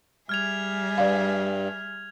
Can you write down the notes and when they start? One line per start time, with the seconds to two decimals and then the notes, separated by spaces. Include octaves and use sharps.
0.29 G3 G#4 E5 F6 G#6 F7
0.98 G2 B4 D5 F5